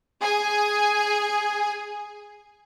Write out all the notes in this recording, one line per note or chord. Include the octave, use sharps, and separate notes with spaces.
G#4 G#5